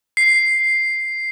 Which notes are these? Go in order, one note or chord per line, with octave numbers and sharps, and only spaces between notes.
C7